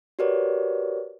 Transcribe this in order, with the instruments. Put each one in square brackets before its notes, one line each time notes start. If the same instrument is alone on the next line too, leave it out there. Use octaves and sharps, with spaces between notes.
[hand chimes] F#4 G4 A#4 B4 C#5 D5